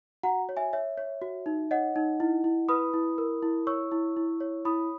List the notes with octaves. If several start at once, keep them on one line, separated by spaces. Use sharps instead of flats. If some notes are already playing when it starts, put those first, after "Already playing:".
F#4 F#5 A#5
C#5
E5 G#5
C#5 E5
C#5
F#4
D#4
C#5 D#5 F#5
D#4
E4
E4
B4 B5 D#6
E4
A#4
E4
C#5 C#6 E6
E4
E4
C#5
E4 B5 D#6